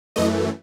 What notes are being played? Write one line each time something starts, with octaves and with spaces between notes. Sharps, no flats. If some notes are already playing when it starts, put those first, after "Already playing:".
F#2 E3 A3 D#5